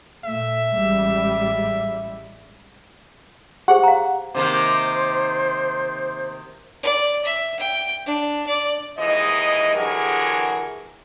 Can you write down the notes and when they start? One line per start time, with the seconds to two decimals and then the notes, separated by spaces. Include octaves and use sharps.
0.25 A#2 A3 E5
0.74 A1 G3 G#3
3.68 G4 G#4 C5 F#5
3.84 F5 A#5
4.35 C3 D#3 A#3 C5
6.83 D5
7.25 E5
7.60 G5
8.06 D4
8.47 D5
8.98 D#2 G#2 E3 D#5
9.75 D3 E3 F#3 G4 G#4 A#4